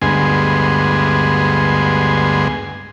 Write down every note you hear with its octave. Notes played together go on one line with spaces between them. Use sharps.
D2 G2 G#3 B3 G#5 C6